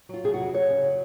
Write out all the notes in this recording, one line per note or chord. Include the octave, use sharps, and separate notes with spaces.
F#3 F4
C3 G#4
F2 F#4
F#2 C#5
C#3
F#3